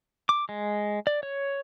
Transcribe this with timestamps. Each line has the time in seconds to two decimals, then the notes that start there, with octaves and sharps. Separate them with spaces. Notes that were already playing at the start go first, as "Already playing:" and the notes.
0.29 D6
0.49 G#3
1.07 D5
1.23 C#5